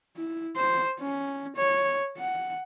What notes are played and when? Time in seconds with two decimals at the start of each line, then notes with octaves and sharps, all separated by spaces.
0.16 E4
0.56 C5
0.99 C#4
1.56 C#5
2.17 F#5